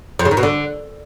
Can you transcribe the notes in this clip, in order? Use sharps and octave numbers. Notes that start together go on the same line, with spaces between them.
F2
C#3
D#3
B2
D3